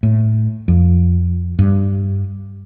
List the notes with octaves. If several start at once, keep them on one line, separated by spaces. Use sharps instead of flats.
A2
F2
G2